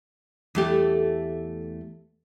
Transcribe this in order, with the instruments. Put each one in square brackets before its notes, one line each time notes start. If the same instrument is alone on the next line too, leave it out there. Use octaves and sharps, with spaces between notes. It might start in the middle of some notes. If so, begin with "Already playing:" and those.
[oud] E2 A3 G4